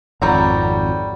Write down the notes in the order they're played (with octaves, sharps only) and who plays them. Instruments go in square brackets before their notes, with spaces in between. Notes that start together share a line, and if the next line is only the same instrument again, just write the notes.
[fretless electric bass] G#1 F2 [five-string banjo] F#3 G3 A#5